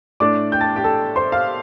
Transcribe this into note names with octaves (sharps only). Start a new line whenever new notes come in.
A2 A3 D4 D5 D6
G5 G6
A5 A6
G4 G5
A4 A5
C5 C6
F5 F6